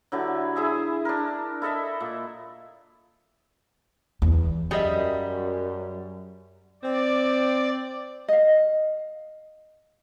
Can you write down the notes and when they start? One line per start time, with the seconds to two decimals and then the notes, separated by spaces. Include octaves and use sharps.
0.12 D3 F#3 E4 G4
0.56 E4 G#4 E5
1.05 D4 A#4
1.62 E4 A4 D#5 E5
2.00 A#2
4.22 E2
4.71 F#2 G3 G#4 D#5 E5
6.83 C4 D5
8.28 D#5 F5